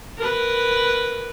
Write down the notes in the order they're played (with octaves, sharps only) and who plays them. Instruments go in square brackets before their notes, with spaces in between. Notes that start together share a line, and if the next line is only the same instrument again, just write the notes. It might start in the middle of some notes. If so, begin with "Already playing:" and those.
[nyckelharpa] A#4 B4